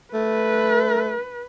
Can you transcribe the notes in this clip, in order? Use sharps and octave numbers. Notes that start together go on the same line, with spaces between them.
A3 B4